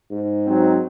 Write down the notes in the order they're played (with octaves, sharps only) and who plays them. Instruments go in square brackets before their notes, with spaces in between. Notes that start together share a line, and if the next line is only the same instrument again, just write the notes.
[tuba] G#2
[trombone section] F#3 C4 D#4